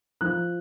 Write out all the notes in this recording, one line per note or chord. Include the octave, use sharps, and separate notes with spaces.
F3 F#6